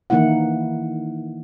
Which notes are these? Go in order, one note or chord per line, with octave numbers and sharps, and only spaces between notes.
D#3 E3 A#3 D#4 E4 F#5